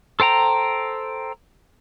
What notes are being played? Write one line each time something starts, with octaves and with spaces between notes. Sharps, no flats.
A4 C5 G5 A#5